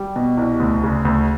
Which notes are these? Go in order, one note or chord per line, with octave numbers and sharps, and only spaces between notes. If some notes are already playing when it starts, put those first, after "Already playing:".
Already playing: G3
B2
C2
D2
C#3
D2